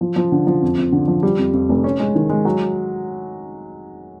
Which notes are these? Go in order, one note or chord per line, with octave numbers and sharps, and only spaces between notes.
F3
F3
D3
F3
F2
F2
D3
F3
G3
F2
F2
F1
C#4
G#3
D#3
G#3
F#3